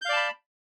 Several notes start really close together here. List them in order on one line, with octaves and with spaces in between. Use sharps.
G6 F5 D5 A5 B5